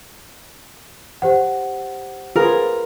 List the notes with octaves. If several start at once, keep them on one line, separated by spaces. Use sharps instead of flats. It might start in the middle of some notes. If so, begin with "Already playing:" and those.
G4 C5 F#5
F4 G#4 A#4 B4